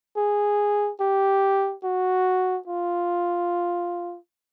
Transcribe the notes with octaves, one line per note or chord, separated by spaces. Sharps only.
G#4
G4
F#4
F4